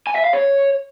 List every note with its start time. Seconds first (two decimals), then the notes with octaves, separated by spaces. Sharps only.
0.07 G#5
0.16 E5
0.24 F5
0.33 C#5